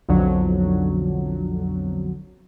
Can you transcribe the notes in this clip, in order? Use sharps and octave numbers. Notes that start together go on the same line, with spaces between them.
B1 F2 D3 F#3